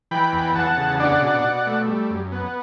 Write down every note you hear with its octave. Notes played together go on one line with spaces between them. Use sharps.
E3 G5 B5
E2
E2 F#5 A5
C#3
D4 D5 F#5
B2
B2
A3
G3
F#2
B3